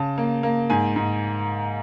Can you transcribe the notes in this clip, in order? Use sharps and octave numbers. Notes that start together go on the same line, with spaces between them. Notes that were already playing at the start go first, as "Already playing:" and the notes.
Already playing: C#3 A5
A#3
A#3
G#2 G#5
G#2